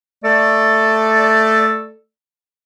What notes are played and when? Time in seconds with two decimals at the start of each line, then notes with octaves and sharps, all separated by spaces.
0.24 A3 A4 D5